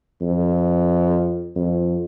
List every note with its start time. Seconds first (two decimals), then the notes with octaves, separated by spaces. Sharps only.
0.22 F2
1.56 F2